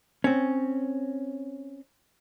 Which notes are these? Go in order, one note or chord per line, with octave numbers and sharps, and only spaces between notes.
C4 C#4